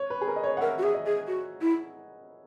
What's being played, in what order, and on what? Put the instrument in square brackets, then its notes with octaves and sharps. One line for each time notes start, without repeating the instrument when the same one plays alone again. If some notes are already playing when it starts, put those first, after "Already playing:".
Already playing: [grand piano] C#5
B4
G#4
A#4
D#5
C#5
F#5
[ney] A#4 [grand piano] E5
[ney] F#4
[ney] G#4 [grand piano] E5
[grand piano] D#5
[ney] G#4
F#4
E4